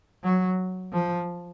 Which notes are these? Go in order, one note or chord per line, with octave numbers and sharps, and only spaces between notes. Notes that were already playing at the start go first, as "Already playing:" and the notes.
F#3
F3